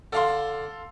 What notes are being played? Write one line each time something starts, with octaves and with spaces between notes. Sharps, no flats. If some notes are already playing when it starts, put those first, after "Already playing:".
D3 A4 F5 C6